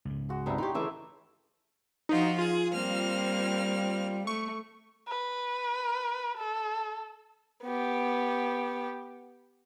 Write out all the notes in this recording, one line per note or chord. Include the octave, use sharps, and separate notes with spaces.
C#2 G#2
G#3 F#4
G2 C3 G3 D#4 E4
D#4 G4 C#5 G5 C6
C#3 E3 A3 D#4 E5 D6
F3 D#4 F4 F#4
F4 G#4
G3 A#3 C4 F6
A3 C#6
B4
A4
B3 G4